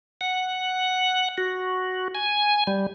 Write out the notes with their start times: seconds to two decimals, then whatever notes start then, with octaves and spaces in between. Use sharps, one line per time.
0.21 F#5
1.38 F#4
2.15 G#5
2.67 G3